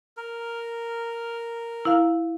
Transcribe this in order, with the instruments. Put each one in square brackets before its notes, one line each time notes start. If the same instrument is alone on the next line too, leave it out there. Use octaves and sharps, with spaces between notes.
[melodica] A#4
[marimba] E4 F5